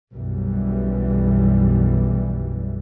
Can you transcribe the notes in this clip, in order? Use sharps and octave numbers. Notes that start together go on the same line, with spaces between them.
B1 F#2 E3 G3